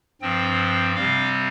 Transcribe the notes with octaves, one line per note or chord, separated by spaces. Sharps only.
G2 F3 C4 G5
C3 G3 C4 F5